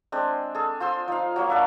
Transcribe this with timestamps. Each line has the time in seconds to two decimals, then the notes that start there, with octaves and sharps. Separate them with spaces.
0.12 G#3 C4 D4
0.55 G#4 A4
0.80 F4 C5 C6 E6
1.08 F3 D#4 F5
1.36 F#3 A#3 C#5
1.50 A#3 D4 E5